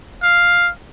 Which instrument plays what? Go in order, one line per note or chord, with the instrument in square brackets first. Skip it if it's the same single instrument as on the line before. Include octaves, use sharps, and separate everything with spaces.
[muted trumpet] F5